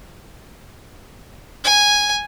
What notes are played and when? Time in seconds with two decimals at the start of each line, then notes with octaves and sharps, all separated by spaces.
1.64 G#5